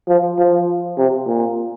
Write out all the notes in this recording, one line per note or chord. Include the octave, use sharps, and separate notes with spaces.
F3
F3
C3
A#2